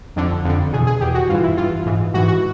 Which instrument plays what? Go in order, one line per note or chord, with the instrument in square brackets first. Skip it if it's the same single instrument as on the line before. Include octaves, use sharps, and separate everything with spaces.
[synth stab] F2 D3
F2 D3
E2 B2 G#4
G#4
E2 B2 G4
F#4
G2 E3 F4
E4
G2 E3 F4
G#2 E3
G#2 E3 F#4
F#4